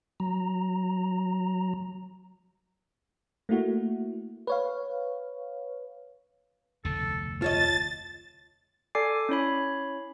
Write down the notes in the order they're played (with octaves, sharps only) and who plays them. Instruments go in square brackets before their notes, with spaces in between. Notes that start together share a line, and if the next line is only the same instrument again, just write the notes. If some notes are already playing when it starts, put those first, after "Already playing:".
[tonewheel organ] F#3 A#5
[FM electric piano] A3 A#3 E4 F#4
B4 C#5 F5
[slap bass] F1 D2 B2 [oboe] A4
[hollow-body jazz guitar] F4 C#5 D#5 [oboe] A5 [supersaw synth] A6
[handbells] A4 D5 G#5 D6 C7
C#4 E4 C#5 B5